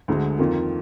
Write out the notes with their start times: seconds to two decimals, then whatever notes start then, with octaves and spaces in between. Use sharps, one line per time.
0.08 D2 D3 G#3
0.39 F2 D#3 A#3 F4